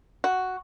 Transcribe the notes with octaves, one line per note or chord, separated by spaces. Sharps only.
F#4